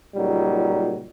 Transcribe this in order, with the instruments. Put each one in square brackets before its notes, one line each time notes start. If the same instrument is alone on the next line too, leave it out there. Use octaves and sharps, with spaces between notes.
[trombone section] C#2 A#2 F#3 G3 D#4